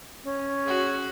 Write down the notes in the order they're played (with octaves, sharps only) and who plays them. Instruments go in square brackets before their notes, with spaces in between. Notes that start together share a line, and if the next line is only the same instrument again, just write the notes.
[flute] C#4
[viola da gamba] F#4 G#4